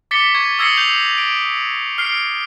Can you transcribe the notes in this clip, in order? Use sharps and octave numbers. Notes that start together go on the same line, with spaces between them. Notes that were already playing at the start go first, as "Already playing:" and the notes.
D6 A6 B6 C#7 G7
C#6 G#6
D#6 E6 G#6 A#6 C7 C#7
G6 C7 F7
D7
F6 C7 D7